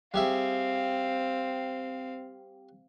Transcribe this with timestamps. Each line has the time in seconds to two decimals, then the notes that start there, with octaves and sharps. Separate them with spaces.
0.14 G3 C4 G#4 E5 F5